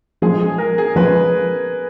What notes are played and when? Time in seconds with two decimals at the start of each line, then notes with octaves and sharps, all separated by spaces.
0.22 F3 G#3 C#4 G#4
0.40 G#4
0.58 A#4
0.78 G#4
0.96 F3 G#3 C#4 B4